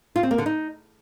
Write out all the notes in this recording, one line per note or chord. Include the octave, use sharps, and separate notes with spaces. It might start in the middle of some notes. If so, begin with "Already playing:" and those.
F4
C4
A#3
D3
D#4